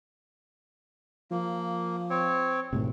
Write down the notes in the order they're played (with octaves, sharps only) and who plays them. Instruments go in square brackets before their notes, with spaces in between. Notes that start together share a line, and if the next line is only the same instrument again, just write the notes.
[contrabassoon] F3 [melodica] A#3
[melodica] C4 C#5
[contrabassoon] G#1 [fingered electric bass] A2 C3